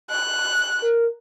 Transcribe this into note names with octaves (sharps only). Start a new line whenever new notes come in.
F#6
A#4